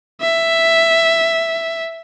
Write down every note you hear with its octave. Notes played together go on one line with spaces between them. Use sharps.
E5